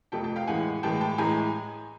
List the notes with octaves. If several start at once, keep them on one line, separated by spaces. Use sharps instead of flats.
F2 C3 F3 A3 G5 A5
G5 A5
F5 G5
A2 E3 G#3 F#5 G#5
A2 E3 G#3 G5 A5
G5 A5
A2 E3 G#3 G#5 A#5